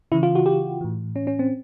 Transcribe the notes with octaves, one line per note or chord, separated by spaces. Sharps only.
C#3 E3 E4
F4
F#4
G4
A2 E3
C#4
C#4
C4